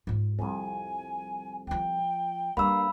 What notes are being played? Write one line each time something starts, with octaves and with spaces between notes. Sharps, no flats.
G#2 F4
C2 F2 G3 G#5
F3 F4 G5
G2 G3 A#3 F5 B5 E6